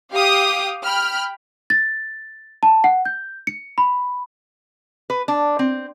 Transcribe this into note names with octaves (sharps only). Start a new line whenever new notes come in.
G4 F5 G5 D6 D#6
G5 B5 F6
A6
A5
F#5
G6
C#7
B5
B4
D4
C4